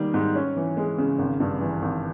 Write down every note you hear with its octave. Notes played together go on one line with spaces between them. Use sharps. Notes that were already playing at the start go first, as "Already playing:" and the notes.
Already playing: D#3 G3 A#3
G#2
C#4
E3
G#3
C#3
G#1
G2
E3
G#1